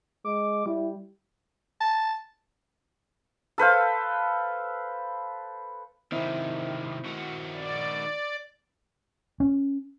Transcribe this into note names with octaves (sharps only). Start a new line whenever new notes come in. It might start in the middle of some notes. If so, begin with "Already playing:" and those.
G#3 D6
G3 E4
A5
A4 B4 C5 F5
C3 D#3 C4 E4
D#3 F#4
D5
C#4